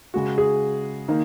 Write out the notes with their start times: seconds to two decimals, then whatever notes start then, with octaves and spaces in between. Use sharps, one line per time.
0.14 C#3 G#3 F#4
0.38 G#4
1.08 D#3 A#3 D#4